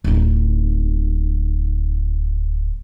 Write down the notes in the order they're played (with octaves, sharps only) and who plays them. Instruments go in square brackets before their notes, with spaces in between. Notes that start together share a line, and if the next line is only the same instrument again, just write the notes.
[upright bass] D1 D#4